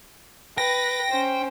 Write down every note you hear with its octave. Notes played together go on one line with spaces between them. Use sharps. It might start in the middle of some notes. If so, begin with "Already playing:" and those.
B4 G5 A#6
C#4 C5